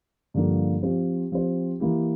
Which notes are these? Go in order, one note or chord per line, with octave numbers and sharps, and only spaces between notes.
G2 D3 F3 A#3
F3 C4 G4 C5
F3 C4 G4 C5
E3 A#3 E4 G4